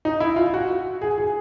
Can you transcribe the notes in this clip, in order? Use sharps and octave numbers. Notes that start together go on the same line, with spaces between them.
D#4
E4
F4
F#4
G#4
G#4